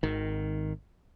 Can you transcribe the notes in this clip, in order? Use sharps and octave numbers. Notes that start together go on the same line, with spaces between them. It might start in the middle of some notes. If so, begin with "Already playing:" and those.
G#1 D#3